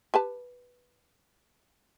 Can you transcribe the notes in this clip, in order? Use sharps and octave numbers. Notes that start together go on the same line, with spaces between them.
G4 B4 A5